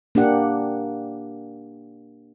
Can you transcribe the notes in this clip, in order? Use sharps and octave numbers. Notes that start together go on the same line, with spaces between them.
A#3 D4 G4 F#5